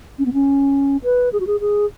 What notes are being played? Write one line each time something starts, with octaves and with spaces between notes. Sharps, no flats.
C#4
B3
C#4
B4
G#4
F#4
G#4
G#4